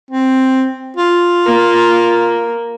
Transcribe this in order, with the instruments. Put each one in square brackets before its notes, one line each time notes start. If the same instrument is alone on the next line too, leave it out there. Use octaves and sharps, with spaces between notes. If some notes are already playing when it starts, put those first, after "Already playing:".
[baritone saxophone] C4
F4
[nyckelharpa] A#3